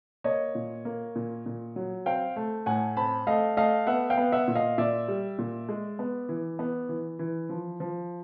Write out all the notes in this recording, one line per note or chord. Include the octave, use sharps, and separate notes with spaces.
A#3 C#5 D#5
A#2
A#3
A#2
A#2
F#3
C4 F5 G5
A3
A2 F#5 G#5
C4 A5 B5
A3 D#5 F5
A3 D#5 F5
B3 E5 F#5
F5 G5
B3
E5 F#5
A#2
D#5 F5
A#2 D5 E5
G3
A#2
G#3
B3
E3
B3
E3
E3
F3
F3